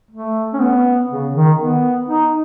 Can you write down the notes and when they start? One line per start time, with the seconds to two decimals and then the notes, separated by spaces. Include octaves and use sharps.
0.11 A3
0.53 C#4
0.60 B3
1.10 C#3
1.34 D#3
1.59 B3
2.08 D#4